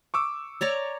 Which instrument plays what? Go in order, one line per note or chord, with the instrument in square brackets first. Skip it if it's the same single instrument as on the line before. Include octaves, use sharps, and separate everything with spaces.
[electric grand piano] C#6 D6 E6
[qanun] C#5 D5 A#5